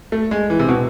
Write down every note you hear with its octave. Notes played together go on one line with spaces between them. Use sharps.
A3
G#3
E3
C3
B2